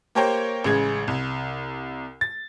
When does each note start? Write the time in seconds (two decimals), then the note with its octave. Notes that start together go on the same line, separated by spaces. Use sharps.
0.15 A#3 G4 A#4 C5 C#5 G5
0.64 A1 C#3 G#3 G#6
1.08 C2
2.21 A6